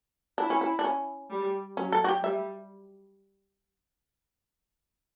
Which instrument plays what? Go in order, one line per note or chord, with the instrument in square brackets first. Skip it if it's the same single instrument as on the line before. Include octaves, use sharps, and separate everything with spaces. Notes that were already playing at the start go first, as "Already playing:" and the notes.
[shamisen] D4 [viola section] E4
[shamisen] C#4
C#4
D4
C#4
[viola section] G3
[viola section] F#3 [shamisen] C#4
[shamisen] A4
F#4
G4
[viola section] G3 [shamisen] E5